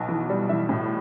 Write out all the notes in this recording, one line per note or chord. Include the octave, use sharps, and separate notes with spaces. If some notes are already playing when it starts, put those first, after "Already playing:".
Already playing: B1 B2
E3
G3
E3 E5
A2